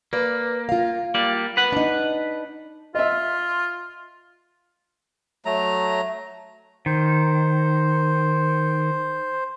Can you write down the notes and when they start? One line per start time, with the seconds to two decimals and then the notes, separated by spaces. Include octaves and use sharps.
0.13 A#3 B4 D5
0.69 F4 F5
1.14 G3 A#3 D5
1.57 B4 F#5
1.72 D4 D#4
2.95 F4 D#5 E5
5.45 F#3 A3 A#5
6.86 D#3 C5